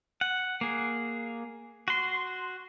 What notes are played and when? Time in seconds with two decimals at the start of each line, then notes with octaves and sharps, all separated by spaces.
0.21 F#5
0.61 A#3 G#4
1.88 F#4 C6